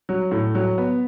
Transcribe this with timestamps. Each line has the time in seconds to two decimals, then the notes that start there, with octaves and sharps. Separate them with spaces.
0.09 F#3
0.31 A2
0.55 F#3
0.78 B3